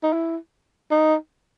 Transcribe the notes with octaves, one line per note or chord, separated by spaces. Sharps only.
D#4
E4
D#4